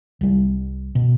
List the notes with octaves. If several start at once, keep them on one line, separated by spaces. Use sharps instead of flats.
C2 G3
B2